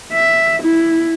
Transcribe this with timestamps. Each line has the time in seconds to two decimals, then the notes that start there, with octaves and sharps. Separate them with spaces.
0.13 E5
0.62 E4